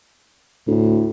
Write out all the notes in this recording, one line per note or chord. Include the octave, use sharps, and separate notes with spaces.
D2 A2